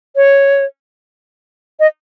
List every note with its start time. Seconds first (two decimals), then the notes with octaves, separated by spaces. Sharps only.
0.16 C#5
1.80 D#5